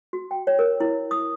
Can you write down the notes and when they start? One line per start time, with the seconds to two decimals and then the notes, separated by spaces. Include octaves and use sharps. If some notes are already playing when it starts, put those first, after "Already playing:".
0.13 F#4
0.31 G5
0.47 C#5
0.59 A#4
0.80 E4
1.11 D#6